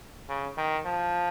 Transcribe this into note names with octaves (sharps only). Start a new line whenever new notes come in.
C#3
D#3
F3